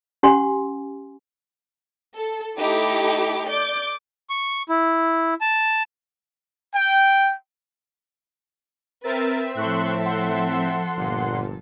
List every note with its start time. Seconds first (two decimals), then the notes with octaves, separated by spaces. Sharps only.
0.23 C#4 G4 F#5 G#5 C6
2.15 A4
2.56 A3 D#4 E4 G4 D6
3.46 D5 D6 G6
4.30 C#6
4.69 E4
5.41 A5
6.75 G5
9.04 C4 A#4 B4 E5 A6
9.57 A2 F3 A4 C6 C#6 F#6
10.05 F#5 C6
10.97 G1 A#2